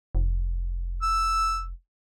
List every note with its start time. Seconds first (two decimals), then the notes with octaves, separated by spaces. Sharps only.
0.15 F1
1.02 E6